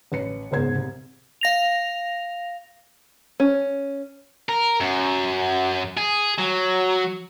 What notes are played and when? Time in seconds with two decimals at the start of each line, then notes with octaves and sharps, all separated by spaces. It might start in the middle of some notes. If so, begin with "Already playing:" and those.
0.12 A1 B4 C#7
0.51 F#1 E2 G#2 C5 G#6
0.75 C2
1.41 F5 A#6 F7
3.40 C#4
4.49 A#4
4.81 F#2
5.97 G#4
6.39 F#3